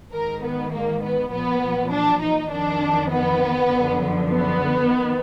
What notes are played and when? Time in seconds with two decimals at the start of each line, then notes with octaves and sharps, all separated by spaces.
0.13 G#2 D#3 A#4
0.44 B3
0.73 A#3
1.03 B3
1.33 A#2 F3 B3
1.92 D4
2.22 D#4
2.51 F2 D#3 D4
3.11 B3
3.71 F#2 D3 F3
4.30 B3
4.90 D#3